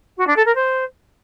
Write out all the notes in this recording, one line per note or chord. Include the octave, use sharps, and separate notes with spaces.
F#4
D4
A4
A#4
C5